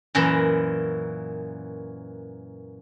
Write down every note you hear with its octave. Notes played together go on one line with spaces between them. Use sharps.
F#2 A#2 E3 E5 A#5 B5